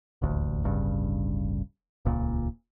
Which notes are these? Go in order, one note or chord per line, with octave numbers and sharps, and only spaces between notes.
D#1 A1 D2
D1 G1 G2 C#3
D#1 C#2 A#2